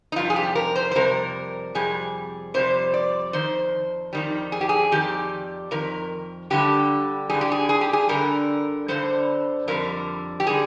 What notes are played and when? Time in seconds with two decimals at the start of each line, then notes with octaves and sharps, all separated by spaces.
0.12 D#4
0.16 F2 C3 G3 F4
0.30 G#4
0.36 G4
0.55 A#4
0.75 C5
0.91 C5
0.95 F2 C3 G3 A#4
1.75 F2 C3 G3 G#4
2.54 F2 C3 G3 C5
2.94 D5
3.33 F2 D#3 C5
4.13 F2 D#3 G3
4.52 G#4
4.61 G4
4.69 G#4
4.92 F2 D#3 G3 G4
5.71 F2 D#3 A#4
6.50 G2 D3 G3 G4
7.30 G2 D3 G3 G#4
7.41 G4
7.52 G#4
7.69 G#4
7.81 G4
7.93 G#4
8.09 G2 D3 G3 A#4
8.88 G2 D3 G3 C5
9.68 F2 D3 G3 A#4
10.40 G4
10.47 D3 G3 G#4